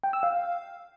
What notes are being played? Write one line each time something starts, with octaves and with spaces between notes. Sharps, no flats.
G5
E6
F5